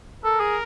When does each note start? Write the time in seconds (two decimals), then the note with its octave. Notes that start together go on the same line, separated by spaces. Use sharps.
0.24 A4 A#4
0.40 G#4